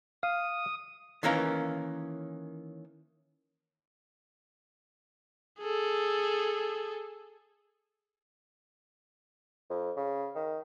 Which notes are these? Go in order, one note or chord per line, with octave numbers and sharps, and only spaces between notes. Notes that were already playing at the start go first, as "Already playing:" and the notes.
F5 D#6
D#3 E3 A#3 C#4 A#4
G#4 A4
F2
C#3
D#3